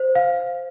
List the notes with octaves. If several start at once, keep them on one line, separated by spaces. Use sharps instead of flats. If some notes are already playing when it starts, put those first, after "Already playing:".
Already playing: C5
F5